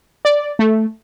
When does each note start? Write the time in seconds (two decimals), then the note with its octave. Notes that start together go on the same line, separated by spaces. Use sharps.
0.25 D5
0.59 A3